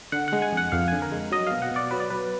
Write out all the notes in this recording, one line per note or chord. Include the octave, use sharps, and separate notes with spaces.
D3 F#5
G#3 F#5
G#5
F2 F#5
F2 F5
D3 G#5
A#4
G#3
F#3 D#5
B2 F5
F#5
B2 D5
F#3 B4
D5
F#3 B4